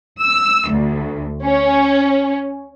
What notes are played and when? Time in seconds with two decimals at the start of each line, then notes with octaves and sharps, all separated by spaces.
0.22 E6
0.71 D2
1.44 C#4